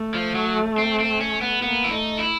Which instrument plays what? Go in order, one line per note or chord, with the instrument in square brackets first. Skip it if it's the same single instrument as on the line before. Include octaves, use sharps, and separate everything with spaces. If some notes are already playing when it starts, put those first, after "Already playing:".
Already playing: [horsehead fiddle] A3
[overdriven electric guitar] F3
F#3
C4
C4
C#4
B3
[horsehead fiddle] A#3 [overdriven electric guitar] B3
[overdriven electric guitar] E4
[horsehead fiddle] A3 [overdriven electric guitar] D#4
[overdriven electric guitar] E4